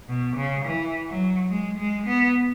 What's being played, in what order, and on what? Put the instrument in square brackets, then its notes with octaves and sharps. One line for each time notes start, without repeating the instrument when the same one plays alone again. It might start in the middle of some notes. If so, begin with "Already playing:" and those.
[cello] B2
C#3
E3
F#3
G#3
G#3
B3